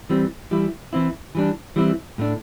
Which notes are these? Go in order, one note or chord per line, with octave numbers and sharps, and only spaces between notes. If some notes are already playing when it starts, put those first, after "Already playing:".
E3 G3 C4
E3 G3 E4
E3 C4 E4
E3 G3 D4
E3 G3 C4 E4
A2 A3 D4